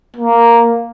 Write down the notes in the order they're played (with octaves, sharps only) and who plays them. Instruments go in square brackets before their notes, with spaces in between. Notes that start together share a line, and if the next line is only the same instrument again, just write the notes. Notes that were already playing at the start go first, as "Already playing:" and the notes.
[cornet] A#3